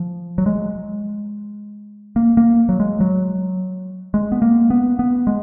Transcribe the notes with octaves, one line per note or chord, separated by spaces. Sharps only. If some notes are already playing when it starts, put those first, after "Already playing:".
Already playing: F3
F#3
G#3
A#3
A#3
F#3
G#3
F#3
G#3
B3
A#3
B3
B3
G#3